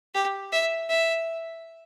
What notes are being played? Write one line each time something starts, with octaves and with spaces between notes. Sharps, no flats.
G4
E5
E5